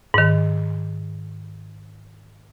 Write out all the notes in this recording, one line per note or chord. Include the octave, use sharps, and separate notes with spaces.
G#2 D#3